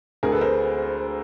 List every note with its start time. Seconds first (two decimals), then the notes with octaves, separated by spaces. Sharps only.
0.23 D2 G#4 A#4
0.32 A4 B4
0.41 A#4 C5